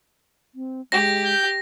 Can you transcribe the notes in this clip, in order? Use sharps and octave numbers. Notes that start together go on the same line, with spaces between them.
C4
G#3 G4 A#6
G6